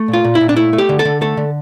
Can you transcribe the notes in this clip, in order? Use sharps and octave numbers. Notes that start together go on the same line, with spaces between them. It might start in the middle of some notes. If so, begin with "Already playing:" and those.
Already playing: A3
A#2
F4
A#2
E4
A#2
D4
A3 E4
A3
G4
D3
A4
D3
A3 A4
D3